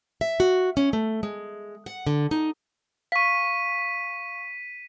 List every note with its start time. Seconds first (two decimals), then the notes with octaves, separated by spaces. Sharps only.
0.21 E5
0.40 F#4
0.77 C#4
0.93 A3
1.23 G#3
1.86 F#5
2.07 D3
2.31 D#4
3.12 F5 C#6 B6 D#7